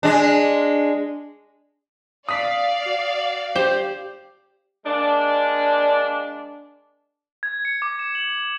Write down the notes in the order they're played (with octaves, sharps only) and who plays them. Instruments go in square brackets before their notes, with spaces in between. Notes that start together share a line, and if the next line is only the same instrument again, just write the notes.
[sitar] G#3 D4
[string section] D5 F5 [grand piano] D#6 B6
[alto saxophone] F#4
[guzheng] G4 [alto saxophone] C5
[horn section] G#3 A#3 D4
[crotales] G#6
C#7
D6
E7
F#7